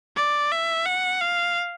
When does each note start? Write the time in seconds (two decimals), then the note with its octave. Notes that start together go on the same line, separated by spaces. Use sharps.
0.16 D5
0.52 E5
0.86 F#5
1.21 F5